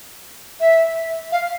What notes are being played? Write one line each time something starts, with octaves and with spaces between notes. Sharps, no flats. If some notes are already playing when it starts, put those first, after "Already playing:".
E5
F5